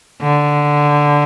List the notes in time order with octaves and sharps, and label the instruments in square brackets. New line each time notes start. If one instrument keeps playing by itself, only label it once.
[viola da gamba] D3